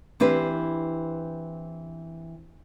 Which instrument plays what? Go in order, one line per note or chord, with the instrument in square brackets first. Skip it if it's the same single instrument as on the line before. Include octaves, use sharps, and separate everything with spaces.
[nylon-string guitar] E3 C4 D4 G4 B4